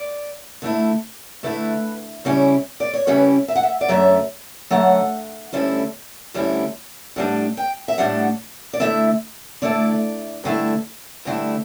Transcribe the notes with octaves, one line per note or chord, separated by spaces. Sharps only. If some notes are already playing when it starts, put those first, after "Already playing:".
Already playing: D5
D3 A3 E4
D3 A3 E4 B4
C#3 G3 C#4 E4
D5
C#5
C#3 G3 C#4 E4 B4
E5
F#5
E5
D5
F#2 D3 F#3 A3 E5
F#2 D3 F#3 A3 F#5
D2 D3 G3 C#4 E4
D2 D3 G3 C#4 E4
A2 G3 D4 F#5
G5
E5
A2 G3 D4 F#5
D5
D3 A3 E4 E5
D3 A3 E4 D5
G2 D3 A3 E4
G2 D3 A3 E4